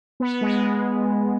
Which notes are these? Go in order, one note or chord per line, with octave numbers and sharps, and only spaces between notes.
B3
G#3